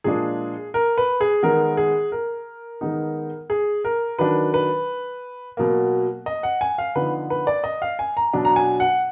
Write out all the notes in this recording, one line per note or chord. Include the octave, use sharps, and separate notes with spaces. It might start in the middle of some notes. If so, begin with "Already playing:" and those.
A#2 F3 G#3 D4 G#4
A#4
B4
G#4
D#3 G#3 B3 A#4
G#4
A#4
D#3 G#3 B3 D#4
G#4
A#4
D#3 F#3 D4 B4
B4
B2 F#3 A#3
D#5
F#5
G#5
F5
D3 F3 B3 D#4 B4
B4
D5
D#5
F5
G#5
A#5
B2 F#3 D4
A#5
G#5
F#5